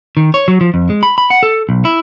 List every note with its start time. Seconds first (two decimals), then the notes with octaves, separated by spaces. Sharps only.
0.17 D#3
0.34 C#5
0.48 F#3
0.61 F3
0.74 F2
0.90 G#3
1.03 B5
1.18 B5
1.30 F#5
1.43 A4
1.69 B1
1.85 E4